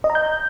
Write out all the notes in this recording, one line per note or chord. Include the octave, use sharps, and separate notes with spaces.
D#5
A#5
G6